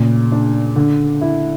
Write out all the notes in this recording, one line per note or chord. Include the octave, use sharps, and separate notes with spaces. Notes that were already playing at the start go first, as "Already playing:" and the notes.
Already playing: A#2 C#3
D4
D3
E4